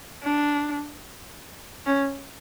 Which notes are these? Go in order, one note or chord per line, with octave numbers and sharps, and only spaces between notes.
D4
C#4